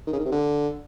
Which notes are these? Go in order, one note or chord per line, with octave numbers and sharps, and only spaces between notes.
D#3
C#3
D#3
C3
D3